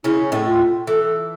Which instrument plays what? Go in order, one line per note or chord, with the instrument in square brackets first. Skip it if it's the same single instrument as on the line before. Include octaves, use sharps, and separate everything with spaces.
[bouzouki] C#3 C#4 [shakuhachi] E4
[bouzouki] A2 A3
[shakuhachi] F4
[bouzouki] E3 [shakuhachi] A4